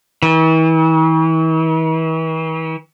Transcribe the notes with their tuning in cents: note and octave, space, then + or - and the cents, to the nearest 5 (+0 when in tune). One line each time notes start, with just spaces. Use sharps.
E3 -40